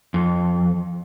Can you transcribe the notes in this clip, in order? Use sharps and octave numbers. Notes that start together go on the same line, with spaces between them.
F2